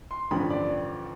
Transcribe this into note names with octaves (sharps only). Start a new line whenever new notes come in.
C6
A1 G2 D3 F3 B5
D5